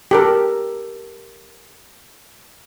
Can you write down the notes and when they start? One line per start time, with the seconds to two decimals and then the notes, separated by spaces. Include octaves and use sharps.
0.11 G4 A4 A#4